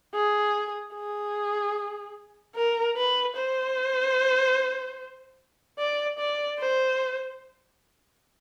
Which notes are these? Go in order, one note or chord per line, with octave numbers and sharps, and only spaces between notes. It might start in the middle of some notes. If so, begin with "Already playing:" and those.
G#4
G#4
A#4
B4
C5
D5
D5
C5